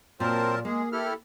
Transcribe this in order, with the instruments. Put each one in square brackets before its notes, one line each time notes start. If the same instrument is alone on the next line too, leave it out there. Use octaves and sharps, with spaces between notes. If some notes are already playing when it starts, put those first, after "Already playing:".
[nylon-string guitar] A#2 [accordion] F#3 A#4 A5 [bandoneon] C4 C5
[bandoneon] G#3 [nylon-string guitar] A#3 [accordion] G#4
[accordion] E4 G4 A4 [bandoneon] F6